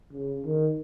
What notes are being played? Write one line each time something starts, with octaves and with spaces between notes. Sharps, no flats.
C#3
D#3